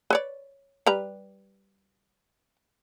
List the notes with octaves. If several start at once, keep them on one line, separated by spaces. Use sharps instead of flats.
B4 C#5 D5
G3 B4 A#5